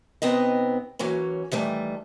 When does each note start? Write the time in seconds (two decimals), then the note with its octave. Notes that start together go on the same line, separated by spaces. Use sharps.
0.22 C3 B3 C4 D#4 D#5
0.99 E3 F#3 A#3 C#4
1.52 D#3 E3 G3 A3